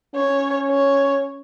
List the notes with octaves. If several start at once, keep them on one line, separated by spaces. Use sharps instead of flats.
C#4 C#5
C#5